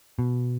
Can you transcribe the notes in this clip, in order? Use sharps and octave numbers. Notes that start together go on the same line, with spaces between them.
B2